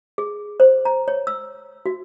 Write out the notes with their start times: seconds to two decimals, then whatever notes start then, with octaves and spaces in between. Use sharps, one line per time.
0.18 G#4
0.60 C5
0.85 A#5
1.08 C#5
1.27 E6
1.86 F#4